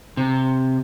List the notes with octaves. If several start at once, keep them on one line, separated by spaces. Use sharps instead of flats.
C3